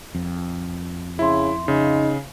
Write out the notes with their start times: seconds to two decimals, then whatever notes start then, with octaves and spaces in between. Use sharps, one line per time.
0.15 F2
1.19 C#3 E4 E5 C6
1.68 C#3 D#4